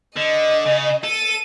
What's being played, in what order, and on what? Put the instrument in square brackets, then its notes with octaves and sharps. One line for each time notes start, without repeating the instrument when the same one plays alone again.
[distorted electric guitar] D3 [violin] D#5
[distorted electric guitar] C#3
[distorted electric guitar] A4 [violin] D#7